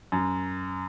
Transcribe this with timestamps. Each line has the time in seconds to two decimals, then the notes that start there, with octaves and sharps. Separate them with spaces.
0.12 F#2